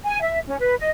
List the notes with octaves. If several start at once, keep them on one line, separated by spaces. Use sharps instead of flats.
G#5
E5
C#4
B4
D#5